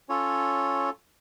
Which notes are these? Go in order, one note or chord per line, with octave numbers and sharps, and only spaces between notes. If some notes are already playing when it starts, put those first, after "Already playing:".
C#4 F4 A4 C#5